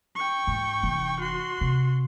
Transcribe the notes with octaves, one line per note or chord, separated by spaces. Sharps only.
G5 C#6
G#2
F1 E3
F#4 C6
C3